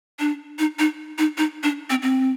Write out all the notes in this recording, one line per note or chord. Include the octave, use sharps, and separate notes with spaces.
D4
D#4
D#4
D#4
D#4
D4
C4
C4